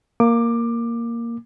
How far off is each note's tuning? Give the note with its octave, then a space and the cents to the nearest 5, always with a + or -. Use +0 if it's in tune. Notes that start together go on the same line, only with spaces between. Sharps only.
A#3 +0 D6 +15